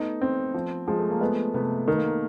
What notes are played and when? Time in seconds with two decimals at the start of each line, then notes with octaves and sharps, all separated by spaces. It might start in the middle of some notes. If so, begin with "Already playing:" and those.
Already playing: A3 B3 D#4
0.21 C4
0.54 F3
0.88 F3 G#3
0.99 A3
1.10 A#3
1.21 G#3 A3 B3
1.54 C3 A3 B3
1.88 D#3 B3
1.97 A#3
2.05 A3 B3